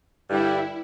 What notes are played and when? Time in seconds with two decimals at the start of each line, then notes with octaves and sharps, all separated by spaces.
0.30 G2 D3 G3 E4